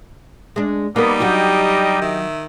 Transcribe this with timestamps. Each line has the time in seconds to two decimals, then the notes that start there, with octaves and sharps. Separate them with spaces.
0.56 G#3 D4
0.96 G3 A#3 B3 D#4 A#4
1.20 F#3 D4 F#4 G4 D#5 G5
2.01 D#3 E5